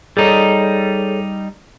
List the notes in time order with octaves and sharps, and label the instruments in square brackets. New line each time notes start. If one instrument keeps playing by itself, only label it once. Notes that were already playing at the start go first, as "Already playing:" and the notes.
[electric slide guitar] G3 D#4 [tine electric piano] G#4 A4 C#5